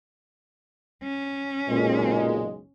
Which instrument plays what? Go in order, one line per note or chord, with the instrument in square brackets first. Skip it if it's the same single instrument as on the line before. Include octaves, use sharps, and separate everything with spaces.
[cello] C#4
[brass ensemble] F#1 B1 G#3 [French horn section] A#2